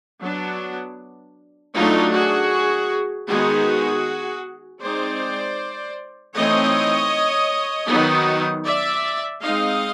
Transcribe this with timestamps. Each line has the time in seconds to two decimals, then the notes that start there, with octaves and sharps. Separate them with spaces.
0.21 F#3 B3 D4
1.75 F#3 A3 D4 D#4 F4
2.13 F#4 G#4
3.28 D#3 G#3 B3 D#4 F#4 G#4
4.81 G#3 C4 D#4 C5 D5
6.35 E3 A3 C4 D#4 C#5 D#5
7.88 D#3 F#3 B3 D#4
8.65 D5 E5
9.41 G#3 C4 D#4 D#5 F5